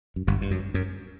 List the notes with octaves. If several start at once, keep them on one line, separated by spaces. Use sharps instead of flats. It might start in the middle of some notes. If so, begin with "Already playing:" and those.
F#2
G1 G2
G2
F#2
F#2